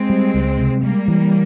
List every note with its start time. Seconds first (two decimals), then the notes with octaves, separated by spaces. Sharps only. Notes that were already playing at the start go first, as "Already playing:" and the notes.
Already playing: G#3 C4
0.10 G3
0.34 C#2
0.58 C3
0.82 G3 G#3 A#3
1.08 E3